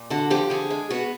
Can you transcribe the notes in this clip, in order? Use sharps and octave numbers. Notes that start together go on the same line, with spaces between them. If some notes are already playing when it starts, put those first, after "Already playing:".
Already playing: A#2
D3 F#4
F3 G4
D3 G#4
G#3
B3 F#4